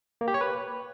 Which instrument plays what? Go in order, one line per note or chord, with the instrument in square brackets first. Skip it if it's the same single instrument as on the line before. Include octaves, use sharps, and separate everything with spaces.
[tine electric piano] A#3
G4
C#5
B4